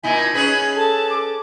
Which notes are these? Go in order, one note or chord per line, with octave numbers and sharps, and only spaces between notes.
A#2 D#4 E4 G#5
G#6
C#4 G#4 B4
A4 A5
D6